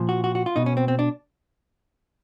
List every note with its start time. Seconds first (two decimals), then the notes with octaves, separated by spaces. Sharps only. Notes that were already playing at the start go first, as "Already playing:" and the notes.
Already playing: A#2 F3
0.09 F#4
0.24 F#4
0.35 F#4
0.46 F4
0.56 B2 D#4
0.66 C#4
0.77 C4
0.88 C4
0.99 D4